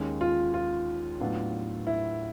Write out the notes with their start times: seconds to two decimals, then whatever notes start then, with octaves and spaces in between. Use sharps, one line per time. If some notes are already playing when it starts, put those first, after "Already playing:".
Already playing: D#2 D#3 G#3 C#4
0.21 F4
0.54 F4
1.21 A2 F#3 B3 D4 F4
1.87 E4